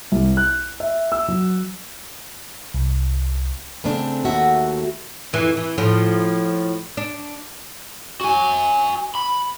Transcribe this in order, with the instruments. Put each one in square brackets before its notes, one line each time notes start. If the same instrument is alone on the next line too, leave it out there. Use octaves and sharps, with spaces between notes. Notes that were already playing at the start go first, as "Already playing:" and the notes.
[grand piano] C2
F#6
E5
E6
F#3
[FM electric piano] C2
[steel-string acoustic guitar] C#3 A3 C4 D4
D#2 A3 F#4 E5
[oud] F2 E3
E3
A2 F3
D4
[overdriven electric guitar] F#4 G#5
B5